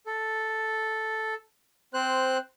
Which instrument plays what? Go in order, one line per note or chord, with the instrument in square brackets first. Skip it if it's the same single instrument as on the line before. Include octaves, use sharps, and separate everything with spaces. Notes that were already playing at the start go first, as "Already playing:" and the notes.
[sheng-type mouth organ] A4
C4 C5 F#6